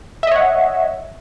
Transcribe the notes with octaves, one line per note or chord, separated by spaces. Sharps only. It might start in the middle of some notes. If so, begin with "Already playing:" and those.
C#5 D#5 E5 F#5